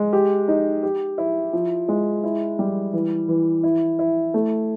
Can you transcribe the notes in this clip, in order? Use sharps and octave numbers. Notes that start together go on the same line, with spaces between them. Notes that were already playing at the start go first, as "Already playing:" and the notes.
Already playing: G#3
G4
D#4
G4
E4
F3
G#3
E4
G3
E3
E3
E4
E4
A3